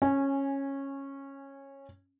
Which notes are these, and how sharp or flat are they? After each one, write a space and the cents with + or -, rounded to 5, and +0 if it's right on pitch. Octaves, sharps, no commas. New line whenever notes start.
C#4 -15 G#5 +0